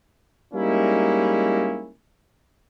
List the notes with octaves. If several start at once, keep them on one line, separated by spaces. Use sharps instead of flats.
G3 G#3 A#3 C#4 D#4 E4